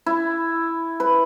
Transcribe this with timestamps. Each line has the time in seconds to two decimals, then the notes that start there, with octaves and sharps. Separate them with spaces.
0.06 E4
1.00 B4